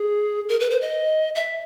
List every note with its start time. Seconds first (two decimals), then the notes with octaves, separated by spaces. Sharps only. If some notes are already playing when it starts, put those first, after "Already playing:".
Already playing: G#4
0.49 A#4
0.60 B4
0.70 C5
0.81 D#5
1.35 E5